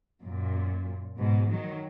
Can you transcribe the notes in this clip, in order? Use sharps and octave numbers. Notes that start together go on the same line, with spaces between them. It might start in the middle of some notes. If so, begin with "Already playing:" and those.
F#2 A#2
G#2 B2
D#3 F#3